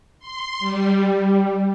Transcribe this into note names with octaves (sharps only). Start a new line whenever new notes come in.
C6
G3